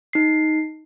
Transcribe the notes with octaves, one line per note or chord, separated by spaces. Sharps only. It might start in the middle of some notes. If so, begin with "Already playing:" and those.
D#4 C7